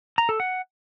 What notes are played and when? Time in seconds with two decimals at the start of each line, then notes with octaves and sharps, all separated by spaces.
0.18 A#5
0.29 A4
0.40 F#5